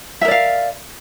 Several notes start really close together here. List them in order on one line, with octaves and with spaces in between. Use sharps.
E5 A#4 D5 F5